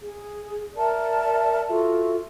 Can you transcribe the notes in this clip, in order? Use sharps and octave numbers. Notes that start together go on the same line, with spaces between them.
G#4
A#4 D5 E5 A5
F4 F#4 A4 E5